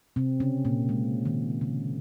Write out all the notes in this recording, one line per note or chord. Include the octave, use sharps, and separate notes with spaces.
C3 C4
C#3 C#4
A#2 A#3
G#3
D#3
C#3